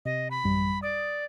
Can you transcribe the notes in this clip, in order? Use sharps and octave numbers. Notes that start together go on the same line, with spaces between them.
C3 D#5
B5
A1 F#2 G3
D5 D#6